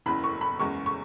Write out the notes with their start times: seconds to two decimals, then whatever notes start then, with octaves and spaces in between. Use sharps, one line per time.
0.06 F#1 E2 C#3 E3 B5
0.24 C#6
0.41 B5
0.59 F#1 E2 C#3 G#3 C#6
0.86 C#6